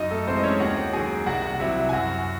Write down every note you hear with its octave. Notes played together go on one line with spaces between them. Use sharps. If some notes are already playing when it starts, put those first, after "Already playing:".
Already playing: F#2 D#4 D#5
A3 A4
E3 G#3 C4 C5
D#5
C#4 C#5
D#2 F#4 F#5
D#3 F#3 G#4 G#5
C2 F#4 F#5
C3 F#3 E4 E5
G#5
F#2 F#4 F#5